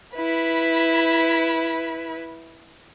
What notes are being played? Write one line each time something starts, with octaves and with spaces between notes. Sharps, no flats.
E4 B4